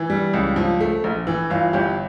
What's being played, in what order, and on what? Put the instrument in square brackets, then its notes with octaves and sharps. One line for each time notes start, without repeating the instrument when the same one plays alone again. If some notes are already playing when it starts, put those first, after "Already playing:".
Already playing: [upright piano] E3
G3
C#2
F3
A3
A#1
E3
G1 F4
G1 G4